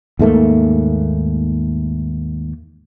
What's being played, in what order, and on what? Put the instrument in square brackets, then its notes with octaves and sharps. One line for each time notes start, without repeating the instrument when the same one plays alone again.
[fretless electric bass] D#2 G#2 A3 A#3